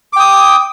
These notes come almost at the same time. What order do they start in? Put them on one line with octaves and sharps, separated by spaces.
D6 G5 D#6